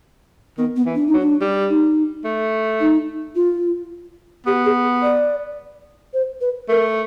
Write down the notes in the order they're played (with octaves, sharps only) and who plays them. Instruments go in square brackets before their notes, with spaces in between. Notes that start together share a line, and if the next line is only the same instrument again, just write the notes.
[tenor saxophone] D#3 [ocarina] B3
[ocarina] B3
[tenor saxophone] E3
[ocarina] D4
D#4
[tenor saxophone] F#3
[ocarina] D4
[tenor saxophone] G3
[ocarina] D#4
[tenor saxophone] A3
[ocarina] D#4
F4
[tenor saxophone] B3 [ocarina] G4
[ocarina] G#4
D5
C5
B4
[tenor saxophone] A3 [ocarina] A#4